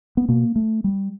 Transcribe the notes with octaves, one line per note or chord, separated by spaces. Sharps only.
B3
B2 A#3
A3
G3